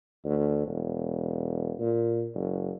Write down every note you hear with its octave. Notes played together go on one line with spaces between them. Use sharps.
D2
E1
A#2
F#1